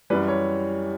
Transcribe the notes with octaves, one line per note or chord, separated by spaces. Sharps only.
F#2 E3 G3 B4
C#5